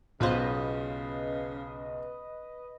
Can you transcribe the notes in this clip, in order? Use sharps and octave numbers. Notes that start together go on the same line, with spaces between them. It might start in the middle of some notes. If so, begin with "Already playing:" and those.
B1 C#3 F4 B4 C5 D#5